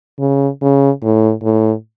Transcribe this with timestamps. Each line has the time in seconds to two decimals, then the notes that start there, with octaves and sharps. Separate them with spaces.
0.19 C#3
0.61 C#3
1.03 A2
1.43 A2